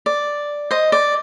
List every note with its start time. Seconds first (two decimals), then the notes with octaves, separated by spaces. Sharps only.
0.06 D5
0.71 C5 D#5
0.92 D5